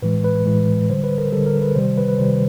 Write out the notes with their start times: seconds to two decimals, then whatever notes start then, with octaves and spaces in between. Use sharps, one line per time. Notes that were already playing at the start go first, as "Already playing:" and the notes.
0.02 A2 E3 G#3 B4
0.24 B4
0.46 A2 E3 G#3
0.90 D3 G3 C5
1.04 B4
1.18 A#4
1.32 D3 G3 A4
1.46 A#4
1.62 B4
1.75 C3 D#3 G3 C5
1.98 B4
2.08 B4
2.19 C3 D#3 G3 C5